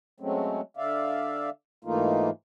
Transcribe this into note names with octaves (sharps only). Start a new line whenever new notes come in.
F#3 G#3 A3 C4 C#4
D3 D5 E5 F5
G#2 E3 A3 A#3 D#4 F4